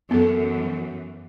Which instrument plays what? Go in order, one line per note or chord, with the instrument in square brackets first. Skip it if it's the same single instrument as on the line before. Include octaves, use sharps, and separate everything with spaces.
[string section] F#2 E3 [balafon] B3 A4